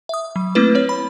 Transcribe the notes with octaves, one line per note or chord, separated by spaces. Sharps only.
E5 D#6
F#3
A3 A#3 C4 E4 B4
C4 C#5
B5